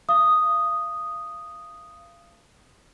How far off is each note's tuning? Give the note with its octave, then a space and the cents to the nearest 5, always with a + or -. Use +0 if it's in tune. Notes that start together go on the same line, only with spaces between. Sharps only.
F5 -30 D#6 +0